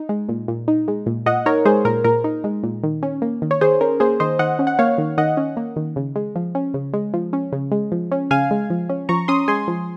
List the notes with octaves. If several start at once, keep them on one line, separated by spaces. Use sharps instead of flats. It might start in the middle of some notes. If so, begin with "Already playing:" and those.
Already playing: D#4
G#3
A#2
A#2
D#4
G#3
A#2
A#2 D#5 F#5
D#4 A#4 C#5
G#3 G#4 C5
A#2 A#4
A#2 A#4
D#4
G#3
A#2
D#3
C#4
A#3
D#3
C#5
D#3 G#4 C5
C#4 A#4
A#3 G#4 C5
D#3 C5 D#5
D#3 D#5 F#5
C#4
F#5
A#3 C#5 F5
D#3
D#3 D#5 F#5
C#4
A#3
D#3
C#3
G#3
F3
C#4
C#3
G#3
F3
C#4
C#3
G#3
F3
C#4
C#3 F5 G#5
G#3
F3
C#4
F3 A#5 C#6
C#4 C6 D#6
G#3 G#5 C6
F3